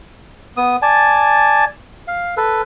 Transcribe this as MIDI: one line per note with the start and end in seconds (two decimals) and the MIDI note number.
0.57 0.76 59
0.57 0.76 87
0.82 1.65 74
0.82 1.65 80
0.82 1.65 81
2.08 2.35 77
2.37 2.62 69
2.37 2.62 71